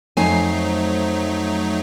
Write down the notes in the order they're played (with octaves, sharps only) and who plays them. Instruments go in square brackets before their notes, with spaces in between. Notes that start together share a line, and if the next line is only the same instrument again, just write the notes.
[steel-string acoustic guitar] F2 C5 G#5 [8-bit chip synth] F#3 A3 D#4